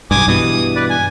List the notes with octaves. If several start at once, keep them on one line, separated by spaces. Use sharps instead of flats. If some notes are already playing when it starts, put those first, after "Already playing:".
B1 G2 G#5 D6 D#6
G2 B2 E3 D#6
B4 D5
G#5